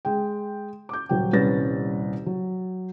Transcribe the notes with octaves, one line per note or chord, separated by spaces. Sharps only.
G#3 G5
D6 G6
D#1 F#3 G5
D#1 C2 C#4 B4 A6 A#6
F#3